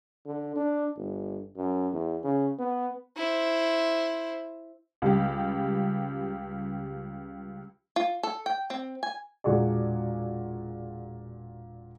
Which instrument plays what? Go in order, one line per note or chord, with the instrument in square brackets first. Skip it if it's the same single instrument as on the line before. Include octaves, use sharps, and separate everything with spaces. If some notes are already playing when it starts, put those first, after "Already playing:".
[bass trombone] D3
D4
G1
F#2
E2
C#3
B3
[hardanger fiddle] E4 C5
[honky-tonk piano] C#2 G3 G4
[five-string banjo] F4
A4
G5
C4
G#5
[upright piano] E1 A#2 F#4 G#4 D5